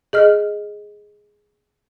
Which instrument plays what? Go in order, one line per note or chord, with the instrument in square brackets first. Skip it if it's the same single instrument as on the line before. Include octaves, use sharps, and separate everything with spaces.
[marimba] G#4 D#5 F6